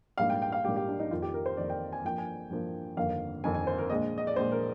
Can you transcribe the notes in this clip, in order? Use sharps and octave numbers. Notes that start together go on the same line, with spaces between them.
A#1 G#2 G3 A#3 F5
G5
G5
F5
A#1 G#2 G3 A#3 G4
G4
D4
D#4
F2 D#3 A#3 F4
G4
A#4
C5
F2 D#3 A#3 D5
G5
G#5
G2 F3 A#3 G5
G#5
G2 F3 A#3
G1 F2 D#3 A#3 F5
G1 F2 D#3 A#3 G#5
G#5
C5
A#4
A#1 A#2 G#3 D#5
D#5
D5
A#1 A#2 G#3 C5
A#4